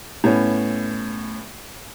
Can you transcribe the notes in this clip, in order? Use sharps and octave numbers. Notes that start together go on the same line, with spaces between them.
A2 B3 C#4